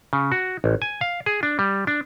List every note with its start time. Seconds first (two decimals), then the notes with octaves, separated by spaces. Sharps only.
0.13 C#3
0.32 F#4
0.64 A1
0.82 G#5
1.01 F5
1.26 G#4
1.43 D4
1.59 G3
1.87 D4